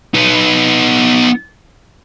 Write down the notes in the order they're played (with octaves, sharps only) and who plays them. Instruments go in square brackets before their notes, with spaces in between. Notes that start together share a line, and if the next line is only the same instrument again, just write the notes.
[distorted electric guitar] B3 D#4